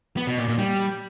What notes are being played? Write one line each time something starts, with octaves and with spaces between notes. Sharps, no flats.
B3
B2
A#2
A#2
G3